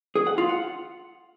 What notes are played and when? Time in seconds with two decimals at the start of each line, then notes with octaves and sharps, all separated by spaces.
0.15 G#4
0.27 F#5
0.38 F4
0.49 F#5